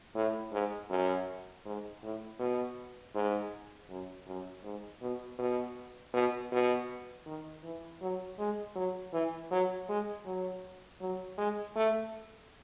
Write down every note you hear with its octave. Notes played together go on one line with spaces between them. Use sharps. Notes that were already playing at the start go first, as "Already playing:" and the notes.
A2
G#2
F#2
G#2
A2
B2
G#2
F#2
F#2
G#2
B2
B2
B2
B2
D#3
E3
F#3
G#3
F#3
E3
F#3
G#3
F#3
F#3
G#3
A3